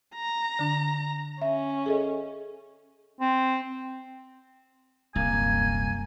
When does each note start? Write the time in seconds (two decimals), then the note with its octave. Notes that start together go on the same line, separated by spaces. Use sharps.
0.15 A#5
0.59 D3 D4
1.42 C#4 E5
1.86 G#4 A4 D#5
3.21 C4
5.16 D#1 C2 F#2 A#3 G#5